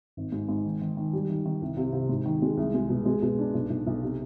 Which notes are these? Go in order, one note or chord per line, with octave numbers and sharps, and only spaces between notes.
G#1
G#2
G#2
D#3
D#3
D#3
G3
D#3
D#3
C2
C3
C3
G#2
D#3
G#3
C2
G#3
B2
G#3
B2
D4
B1
B1
B1
C3